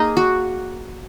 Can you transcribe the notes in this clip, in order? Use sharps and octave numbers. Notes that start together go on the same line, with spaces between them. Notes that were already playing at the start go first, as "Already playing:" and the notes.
Already playing: A#3 D#4 G#4
F#4